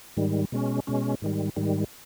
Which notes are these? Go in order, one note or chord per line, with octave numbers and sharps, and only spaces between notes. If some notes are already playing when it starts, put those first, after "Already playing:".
G#2 D#3 G3
B2 G#3 C#4
B2 G#3 C#4
G#2 D#3 G3
G#2 D#3 G3